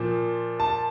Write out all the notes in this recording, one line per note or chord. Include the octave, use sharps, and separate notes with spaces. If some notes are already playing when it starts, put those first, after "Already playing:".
Already playing: A#2 F3
A5